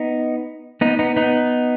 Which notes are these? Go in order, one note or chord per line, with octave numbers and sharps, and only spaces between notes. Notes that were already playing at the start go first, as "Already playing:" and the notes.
Already playing: B3 D#4
B3 D#4
B3 D#4
B3 D#4